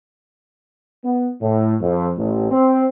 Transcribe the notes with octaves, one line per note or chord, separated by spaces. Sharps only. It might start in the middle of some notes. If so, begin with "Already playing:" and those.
B3
A2
F2
A1
C4